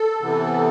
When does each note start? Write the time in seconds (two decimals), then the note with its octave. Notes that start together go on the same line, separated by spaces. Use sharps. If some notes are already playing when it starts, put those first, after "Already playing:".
Already playing: A4
0.22 C3 E3 B3